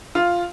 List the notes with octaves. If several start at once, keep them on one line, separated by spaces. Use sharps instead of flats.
F4